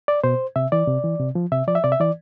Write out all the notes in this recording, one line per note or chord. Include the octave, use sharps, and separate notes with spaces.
D5
B2 C5
C3 E5
E3 D5
C3
E3
C3
F3
C3 E5
F3 D5
E5
C3 D5
E5
E3 D5